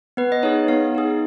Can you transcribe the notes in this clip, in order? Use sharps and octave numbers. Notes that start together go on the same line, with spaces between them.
B3 B4
D#5
D#4 G#4 C#5
B3 F5
D#4 G#4